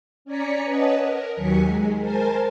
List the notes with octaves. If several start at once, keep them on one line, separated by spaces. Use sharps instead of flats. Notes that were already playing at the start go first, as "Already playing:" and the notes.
C#4 D5 G#5 A#5 B6 C#7
B4 C#5 D#5 F#5 A5
A#4
D#2 D#3 F#3 G#5 B6 C#7
G#3
A#4 C5 G#5 A5